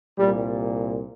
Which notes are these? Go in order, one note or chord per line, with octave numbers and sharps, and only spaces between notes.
C2 A#2 G3